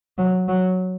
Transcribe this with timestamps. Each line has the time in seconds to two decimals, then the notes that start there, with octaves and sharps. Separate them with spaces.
0.18 F#3
0.48 F#3